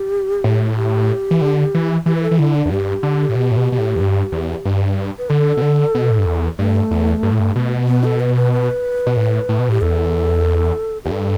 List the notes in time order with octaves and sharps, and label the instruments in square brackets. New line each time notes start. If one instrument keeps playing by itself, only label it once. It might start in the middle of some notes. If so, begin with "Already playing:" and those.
Already playing: [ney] G4
[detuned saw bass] A2
[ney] G4
[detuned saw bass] E3
D3
E3
[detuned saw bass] E3 [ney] G4
[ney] B4
A4
[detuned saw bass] E3
[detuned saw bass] D3 [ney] E4
[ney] D4
[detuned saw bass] E2
[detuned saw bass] G2 [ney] G4
[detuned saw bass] D3
A2
B2
A2
B2
B2
A2
E2
G2
E2
G2
[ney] B4
[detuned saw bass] D3 [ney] A4
[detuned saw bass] B2
D3
B2
A2
G2
E2
[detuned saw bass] G2 [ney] A3
[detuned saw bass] E2
G2
A2
G2
B2
[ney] B3
A4
B4
B4
B4
[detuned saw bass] B2
A2
A2
B2
[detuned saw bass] A2 [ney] G4
[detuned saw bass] E2 [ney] A4
[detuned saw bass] E2 [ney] G4
[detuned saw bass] G2 [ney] A4